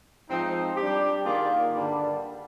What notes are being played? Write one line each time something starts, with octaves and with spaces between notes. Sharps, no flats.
G#2 F3 C4 D#4
G3 D4 G4
D#3 A#3 F4 G#4 D5
G2 D3 G3 D4